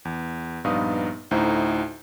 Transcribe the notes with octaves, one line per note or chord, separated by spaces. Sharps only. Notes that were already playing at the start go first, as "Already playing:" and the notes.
E2
A#1 G2 B3 D#4 F5 D#6
D2 A2 D#4 E4 C5 A#5